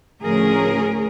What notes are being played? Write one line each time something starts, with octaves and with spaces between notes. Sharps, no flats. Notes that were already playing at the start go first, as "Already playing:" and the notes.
D2 A2 F3 C#4 G#4 A#4